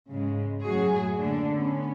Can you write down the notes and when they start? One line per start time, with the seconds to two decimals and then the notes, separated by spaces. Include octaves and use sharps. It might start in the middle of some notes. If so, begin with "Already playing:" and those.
0.11 G#2 C#3 G#3
0.62 F#2 A2 F#3 F#4 G#4
1.18 D3 A3 A#3 D4
1.53 B3 C#4